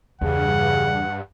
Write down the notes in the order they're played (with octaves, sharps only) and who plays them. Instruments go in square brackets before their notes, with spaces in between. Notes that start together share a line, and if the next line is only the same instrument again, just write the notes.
[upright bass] E2 [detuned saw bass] G2 [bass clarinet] C#3 [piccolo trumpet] F#5